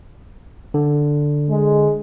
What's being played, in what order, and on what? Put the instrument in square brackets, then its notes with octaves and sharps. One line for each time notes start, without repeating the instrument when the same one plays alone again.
[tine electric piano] D3
[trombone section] G#3